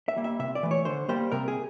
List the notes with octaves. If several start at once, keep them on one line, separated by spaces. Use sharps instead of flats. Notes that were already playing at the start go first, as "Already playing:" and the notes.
E5
G3 A#3
E5
C3 E5
D5
E3 A3
C#5
D3 C5
G3 A#3 C5
C3 A#4
G#4